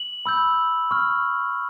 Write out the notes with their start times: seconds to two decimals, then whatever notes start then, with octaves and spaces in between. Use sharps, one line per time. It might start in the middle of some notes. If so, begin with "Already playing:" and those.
Already playing: F#7
0.26 B5 E6 G6
0.91 C#6 F6